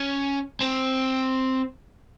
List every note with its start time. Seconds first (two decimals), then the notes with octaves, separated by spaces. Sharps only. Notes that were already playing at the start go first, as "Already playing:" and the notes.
Already playing: C#4
0.61 C4